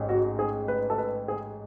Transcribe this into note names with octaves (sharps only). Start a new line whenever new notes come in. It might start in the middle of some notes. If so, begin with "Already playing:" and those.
Already playing: A1 G#2
F#4
G#4
B4
A4
B4
G#4